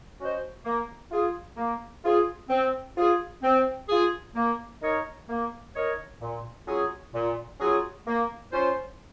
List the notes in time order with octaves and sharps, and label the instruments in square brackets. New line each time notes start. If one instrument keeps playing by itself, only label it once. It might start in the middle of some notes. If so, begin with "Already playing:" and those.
[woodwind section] C#4 F#4 C5 D#5
A#3
F4 G#4
A#3
F4 G#4
C4
F4 G#4
C4
F4 G#4
A#3
D#4 A#4 C#5
A#3
D#4 A#4 C#5
A#2
F#3 C#4 F4 G#4
A#2
F#3 C#4 F4 G#4
A#3
C#4 F4 C5